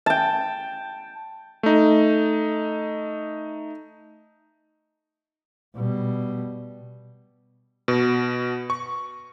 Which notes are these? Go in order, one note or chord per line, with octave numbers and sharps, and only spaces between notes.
G5 A5
A3 D#4
B2 G3
B2
C#6